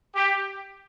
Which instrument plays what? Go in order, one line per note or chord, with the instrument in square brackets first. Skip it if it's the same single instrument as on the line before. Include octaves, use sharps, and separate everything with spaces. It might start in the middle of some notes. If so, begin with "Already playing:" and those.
[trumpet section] G4